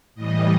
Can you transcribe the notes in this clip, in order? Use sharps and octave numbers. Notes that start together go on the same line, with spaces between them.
A2 E3 G3 D#5